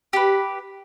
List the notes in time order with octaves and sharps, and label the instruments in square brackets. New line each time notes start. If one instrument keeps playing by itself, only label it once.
[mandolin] G4 B4